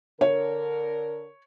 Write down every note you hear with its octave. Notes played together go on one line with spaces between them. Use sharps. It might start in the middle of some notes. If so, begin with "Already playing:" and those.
D3 A#4 C#5